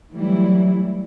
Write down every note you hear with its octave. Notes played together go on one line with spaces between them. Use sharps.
E3 F#3 G3 A3 E4